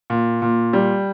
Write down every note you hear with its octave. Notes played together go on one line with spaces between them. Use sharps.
A#2
A#2
G3